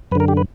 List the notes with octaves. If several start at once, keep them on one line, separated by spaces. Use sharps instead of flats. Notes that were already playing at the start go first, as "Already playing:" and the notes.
F#2 D3 A#4 B4
G4
B4